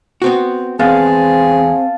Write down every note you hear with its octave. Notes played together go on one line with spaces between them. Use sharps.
B3 C4 F#4
E2 G#3 B3 C4 G#4 F5 A5